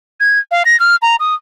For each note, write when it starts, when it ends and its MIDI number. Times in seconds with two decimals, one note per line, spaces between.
0.20 0.39 92
0.51 0.63 77
0.65 0.79 94
0.80 0.96 89
1.02 1.16 82
1.20 1.34 87